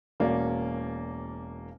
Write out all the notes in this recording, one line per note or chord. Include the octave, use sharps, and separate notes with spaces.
E1 A#3 C#4 F#4 D5